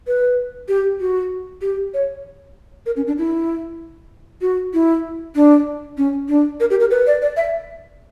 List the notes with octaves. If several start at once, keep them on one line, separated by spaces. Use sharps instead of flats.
B4
G4
F#4
G4
C#5
A#4
C#4
D4
E4
F#4
E4
D4
C#4
D4
A#4
G4
A#4
B4
D5
D5
E5